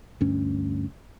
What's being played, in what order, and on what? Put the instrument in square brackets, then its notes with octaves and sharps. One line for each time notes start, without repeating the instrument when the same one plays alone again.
[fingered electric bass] D2 G2 C#4